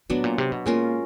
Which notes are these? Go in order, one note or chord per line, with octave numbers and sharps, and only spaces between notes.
A2 F#3 B3 D4
A#2
C3
B2
A#2 G#3 C#4 F4 A#4